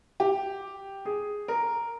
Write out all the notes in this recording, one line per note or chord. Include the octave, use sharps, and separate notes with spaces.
G4
G#4
A#4